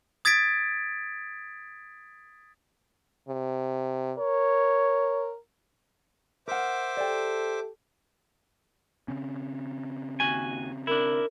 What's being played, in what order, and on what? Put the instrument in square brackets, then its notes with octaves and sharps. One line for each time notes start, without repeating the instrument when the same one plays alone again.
[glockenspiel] D#6 G#6 A6 B6 D7
[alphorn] C3
[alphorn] A#4 [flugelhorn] C#5
[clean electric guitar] A#4 F#5 [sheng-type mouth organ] C5 E5 D6
[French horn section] G4 A4 [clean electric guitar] D5 G5
[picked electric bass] C#3 C4 C#4
[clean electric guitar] D#2 F#4 G#5
[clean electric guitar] D4 E4 [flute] A#4